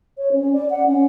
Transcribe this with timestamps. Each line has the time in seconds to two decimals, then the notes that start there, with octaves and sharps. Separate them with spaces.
0.18 C#5
0.33 C#4
0.53 D5
0.70 F#5
0.87 C#4